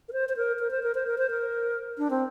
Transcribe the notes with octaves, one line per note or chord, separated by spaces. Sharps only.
A#4
C5
C5
A#4
A#4
C5
A#4
C5
A#4
C5
A#4
D4
C4